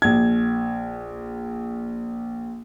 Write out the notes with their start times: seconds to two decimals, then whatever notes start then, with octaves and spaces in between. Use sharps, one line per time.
0.02 A#1 G#6